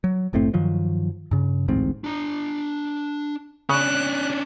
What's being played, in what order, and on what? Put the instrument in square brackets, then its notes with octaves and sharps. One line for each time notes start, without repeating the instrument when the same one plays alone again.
[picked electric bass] F#3
F#1 A2 A3 C4
G2 D#3 F3 F#3
G2 C#3
D1 A1 G#2 C4
[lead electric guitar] D4 A#5
[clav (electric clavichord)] C#3 [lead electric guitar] C#4 D4 [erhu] F#6